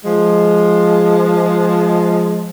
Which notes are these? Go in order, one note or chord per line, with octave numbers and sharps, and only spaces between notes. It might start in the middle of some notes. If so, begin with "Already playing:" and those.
F3 G#3